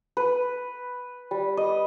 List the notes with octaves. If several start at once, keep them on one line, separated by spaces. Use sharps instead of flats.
B4
G3
D#5